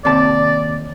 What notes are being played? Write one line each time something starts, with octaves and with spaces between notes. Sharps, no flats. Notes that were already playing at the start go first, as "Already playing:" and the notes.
D#2 C3 D5 A5